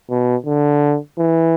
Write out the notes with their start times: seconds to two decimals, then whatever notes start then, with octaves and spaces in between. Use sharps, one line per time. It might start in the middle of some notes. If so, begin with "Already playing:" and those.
0.10 B2
0.46 D3
1.18 E3